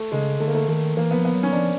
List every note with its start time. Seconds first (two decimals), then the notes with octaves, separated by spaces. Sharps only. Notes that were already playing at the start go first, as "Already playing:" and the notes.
Already playing: A3
0.12 C#3 G#3
0.40 D3 A3
0.48 A#3
0.55 A3
0.68 D#3 A3
0.97 E3 A#3
1.11 F3 B3
1.25 B3
1.34 F#3
1.43 C#4
1.53 F3 D4